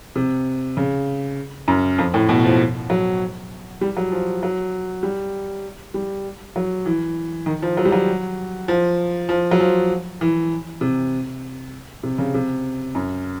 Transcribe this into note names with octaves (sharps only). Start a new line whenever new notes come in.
C3
C#3
F#2
F2
A2
B2
F3
F#3
G3
F#3
F3
F#3
G3
G3
F#3
E3
D#3
F3
F#3
G3
F#3
F3
F3
F#3
F3
E3
C3
C3
C#3
C3
F#2